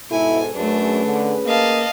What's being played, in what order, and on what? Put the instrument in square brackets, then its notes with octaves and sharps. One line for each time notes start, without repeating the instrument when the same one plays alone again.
[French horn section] G#2 B2 A4 [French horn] E4 [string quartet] G#5
[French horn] F#2 [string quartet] A3 D4 [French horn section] C#4 G#4 B4
[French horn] D3
[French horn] A#3 [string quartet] D#5 F5 A5